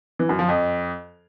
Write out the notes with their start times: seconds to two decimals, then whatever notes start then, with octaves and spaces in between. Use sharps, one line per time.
0.19 E3
0.29 F#2
0.39 F3
0.49 F2